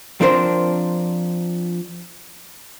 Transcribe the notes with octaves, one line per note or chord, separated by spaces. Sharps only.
F3 C4 D4 A#4 C5